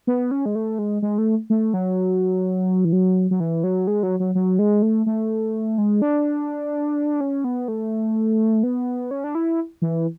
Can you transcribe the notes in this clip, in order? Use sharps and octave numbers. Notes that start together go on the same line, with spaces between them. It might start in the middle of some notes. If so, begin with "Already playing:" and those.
B3
C#4
G#3
A3
G#3
G#3
A3
A3
F#3
E3
F#3
F#3
E3
F#3
G#3
F#3
F#3
F#3
G#3
A3
A3
G#3
D4
C#4
B3
A3
B3
C#4
D4
E4
E3